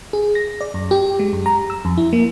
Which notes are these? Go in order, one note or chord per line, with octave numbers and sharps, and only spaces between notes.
G#4
A#6
D5
F#2
G4
G#3
F#2
A#5
E6
F2
E4
A#3